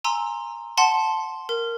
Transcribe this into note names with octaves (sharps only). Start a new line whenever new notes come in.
G#5 A#5 C6 E6
F#5 A5 C6
A#4